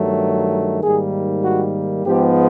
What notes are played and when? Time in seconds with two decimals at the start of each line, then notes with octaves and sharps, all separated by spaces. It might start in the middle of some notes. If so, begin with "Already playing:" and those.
Already playing: G2 D#3 F#3 A3
0.81 G#2 D#3 G3 A#3 G#4
1.44 F#4
2.05 G#2 F3 G#3 B3 G4